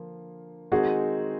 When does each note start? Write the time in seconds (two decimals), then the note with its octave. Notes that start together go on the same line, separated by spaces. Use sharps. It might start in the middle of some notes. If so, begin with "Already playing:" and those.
Already playing: D3 F3 A#3
0.72 D#3 G#3 C4 D#4 F#4 G#4